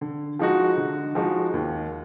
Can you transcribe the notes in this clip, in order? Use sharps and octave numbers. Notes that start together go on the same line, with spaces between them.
D3
F3 G#3 D#4 F#4
D3
F3 G#3 D#4 F#4
D#2